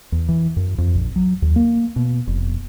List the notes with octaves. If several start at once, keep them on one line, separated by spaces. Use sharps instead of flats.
E2
E3
F#2
F2
A#1
F#3
D#2
A#3
B2
F1